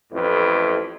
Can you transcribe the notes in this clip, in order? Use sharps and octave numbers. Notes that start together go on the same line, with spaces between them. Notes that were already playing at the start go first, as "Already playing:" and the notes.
A1 F2 A2 B4